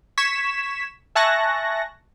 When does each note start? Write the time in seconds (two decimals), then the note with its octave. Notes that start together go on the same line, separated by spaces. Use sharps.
0.18 C#6 G#6 B6 E7
1.15 E5 G#5 A5 C#6 F#6 A#6